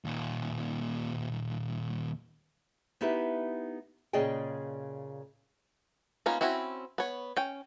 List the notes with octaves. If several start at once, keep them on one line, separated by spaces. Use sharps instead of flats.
D#2 A#2
B3 D#4 E4 G4 B4
A#2 C#3 G#4 D5 D#5 G5
A#3 B3 C#4 D#4 F4
C4 C#4 E4 F#4
B3 C#5
C#4 G5